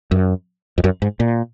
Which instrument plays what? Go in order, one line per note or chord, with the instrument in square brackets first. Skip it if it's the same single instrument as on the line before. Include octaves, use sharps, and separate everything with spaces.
[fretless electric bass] F#2
F2
F#2
G#2
A#2